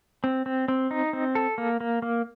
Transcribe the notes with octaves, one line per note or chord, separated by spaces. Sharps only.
C4
C4
C4
D#4
C4
A4
A#3
A#3
A#3